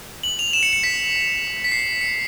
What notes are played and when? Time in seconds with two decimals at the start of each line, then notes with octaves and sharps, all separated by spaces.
0.23 F#7
0.39 F7
0.53 E7
0.63 C#7
0.73 C#7
0.83 B6
1.64 B6
1.72 C7
2.01 C#7